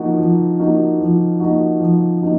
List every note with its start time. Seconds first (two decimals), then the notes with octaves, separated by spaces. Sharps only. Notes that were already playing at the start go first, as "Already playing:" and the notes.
Already playing: F3 A#3 D#4 F#4
0.18 F3
0.59 A#3 D#4 F#4
1.00 F3
1.40 A#3 D#4 F#4
1.80 F3
2.21 A#3 D#4 F#4